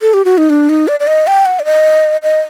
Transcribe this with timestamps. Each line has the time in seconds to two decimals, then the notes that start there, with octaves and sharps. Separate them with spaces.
0.01 A4
0.14 G4
0.25 F#4
0.38 D#4
0.50 D4
0.69 D#4
0.88 D5
1.00 D5
1.07 D#5
1.27 G5
1.46 F#5
1.60 D5
1.65 D#5
2.23 D#5